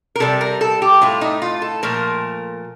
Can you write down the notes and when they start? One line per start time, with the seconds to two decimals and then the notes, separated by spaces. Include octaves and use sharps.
0.16 A#4
0.20 C3 G3 A4
0.41 A#4
0.61 A4
0.82 G4
1.01 A2 A3 F4
1.21 D#4
1.42 F4
1.62 A4
1.83 A#2 F3 A3 A#4